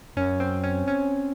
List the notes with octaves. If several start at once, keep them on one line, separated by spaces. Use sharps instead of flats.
F#2 C#4
C4
C#4
C#4